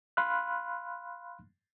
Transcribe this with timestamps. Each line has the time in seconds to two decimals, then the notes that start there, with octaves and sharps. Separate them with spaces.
0.17 F5 B5 C6 F6 F#6